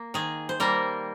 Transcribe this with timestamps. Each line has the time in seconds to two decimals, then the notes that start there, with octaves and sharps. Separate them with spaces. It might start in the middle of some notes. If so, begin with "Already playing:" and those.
Already playing: A#3
0.14 D#3 G#4
0.49 C5
0.60 G3 A#3 A#4